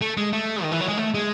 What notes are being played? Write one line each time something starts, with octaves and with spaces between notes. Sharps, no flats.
A3
G#3
A3
D#3
E3
F#3
G#3
A3
G#3